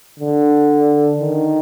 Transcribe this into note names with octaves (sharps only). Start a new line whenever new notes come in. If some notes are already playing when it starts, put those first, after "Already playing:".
D3
D#3